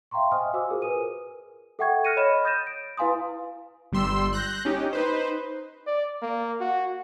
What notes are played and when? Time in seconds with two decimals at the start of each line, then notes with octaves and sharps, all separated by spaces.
0.11 E5 F5 G5 A#5 C6 C#6
0.32 C5 D#5 G#5 D#6 F6
0.54 F#4 C5 G#5 D6 E6
0.70 F4 G#4 A#4 C5
0.82 A#4 B4 G#5 D#6 D#7
1.79 A4 E5 F#5 G5 C#6 G#6
2.05 F6 F#6 A#6 C#7 D#7
2.17 C#5 D#5 B5 F6 E7
2.45 D#6 G6 A6 A#6 D#7 E7
2.67 D7
2.97 E4 B4 F5 G#5 C6 D#6
3.92 G1 G3 C6 E6
4.33 F#6 G6 A#6
4.65 C#4 D#4 G4
4.93 D#4 B4 C5
5.87 D5
6.22 A#3
6.61 F#4